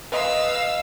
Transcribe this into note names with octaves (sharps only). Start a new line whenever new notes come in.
B4 D#5 F5 E6